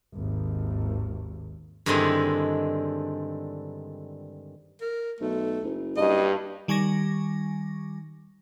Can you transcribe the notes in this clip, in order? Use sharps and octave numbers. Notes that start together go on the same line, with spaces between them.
G#1 D#2
G2 D3 D#3 G#3 C4 E4
A#4
B1 A3
F#1
G2 D#5
D#3 G3 G#5 C#6 D6 A#6